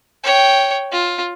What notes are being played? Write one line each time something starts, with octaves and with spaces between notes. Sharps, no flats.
C#5 G5
F4